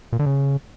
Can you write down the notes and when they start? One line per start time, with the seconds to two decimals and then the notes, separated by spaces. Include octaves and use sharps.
0.13 A#2
0.19 D3
0.26 C#3